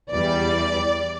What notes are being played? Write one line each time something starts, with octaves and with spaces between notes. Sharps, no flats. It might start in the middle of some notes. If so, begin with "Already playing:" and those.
E2 E3 G3 D5